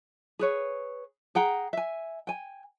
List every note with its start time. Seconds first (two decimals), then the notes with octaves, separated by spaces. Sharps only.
0.39 G#4 B4 C#5
1.35 G#4 F#5 G5 A#5
1.73 E5 G#5
2.27 G5 G#5